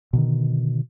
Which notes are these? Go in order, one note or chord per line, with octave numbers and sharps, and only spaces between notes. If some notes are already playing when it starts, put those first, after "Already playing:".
B2 D3 D#3